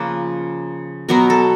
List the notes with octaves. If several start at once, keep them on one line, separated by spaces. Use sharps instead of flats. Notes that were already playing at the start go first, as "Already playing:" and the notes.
Already playing: C#3 F3 A#3 C#4 B4
B2 F#3 B3 A#4
A4